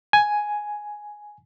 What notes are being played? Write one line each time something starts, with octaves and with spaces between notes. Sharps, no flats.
G#5